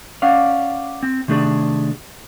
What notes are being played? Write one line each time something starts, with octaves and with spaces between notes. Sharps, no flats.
C#4 D5 F5 F#5
C4
C3 D#3 A3 D4 G#4 D5